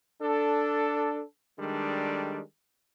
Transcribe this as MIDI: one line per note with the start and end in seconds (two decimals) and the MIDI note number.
0.21 1.21 62
0.21 1.21 69
1.58 2.40 51
1.58 2.40 55
1.58 2.40 56
1.58 2.40 62
1.58 2.40 69